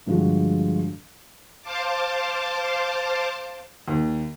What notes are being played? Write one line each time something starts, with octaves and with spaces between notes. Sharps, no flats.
G2 D3 F3 G#3 F#4
C5 F5 A5 D6
D#2